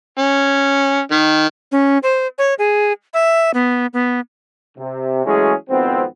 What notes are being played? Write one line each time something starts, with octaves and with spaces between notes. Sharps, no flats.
C#4
D#3
C#4
C5
C#5
G#4
E5
B3
B3
C3
E3 F#3 G#3 A3 C#4 G#4
G#1 F2 B3 C4